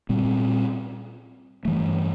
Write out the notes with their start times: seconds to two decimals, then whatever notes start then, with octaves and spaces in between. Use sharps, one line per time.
0.09 A#2 G3 C4
1.65 G2 E3 A3